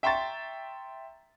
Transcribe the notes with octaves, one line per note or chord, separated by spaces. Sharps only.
E5 G5 A#5 C6 C#6 A6